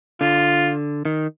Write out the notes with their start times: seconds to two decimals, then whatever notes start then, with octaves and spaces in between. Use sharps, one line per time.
0.21 D3 F4
1.05 D#3